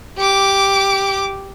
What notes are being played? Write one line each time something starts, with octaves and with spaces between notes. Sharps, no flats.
G4 D6